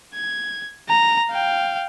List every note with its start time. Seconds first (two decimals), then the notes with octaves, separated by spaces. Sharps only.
0.15 G#6
0.89 A#5
1.30 F5 G5